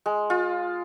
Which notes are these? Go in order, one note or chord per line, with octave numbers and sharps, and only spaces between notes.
G#3
F4